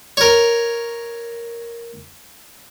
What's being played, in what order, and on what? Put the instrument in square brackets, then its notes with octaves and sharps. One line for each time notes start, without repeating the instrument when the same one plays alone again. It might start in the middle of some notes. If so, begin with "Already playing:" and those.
[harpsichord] A#4 C#5